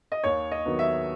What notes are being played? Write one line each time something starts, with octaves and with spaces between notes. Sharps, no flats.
D#5
D#2 C#5
D#5
D#3 F#3 B3
E5